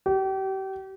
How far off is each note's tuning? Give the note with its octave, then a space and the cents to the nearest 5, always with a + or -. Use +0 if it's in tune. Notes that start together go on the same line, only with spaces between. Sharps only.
G4 -35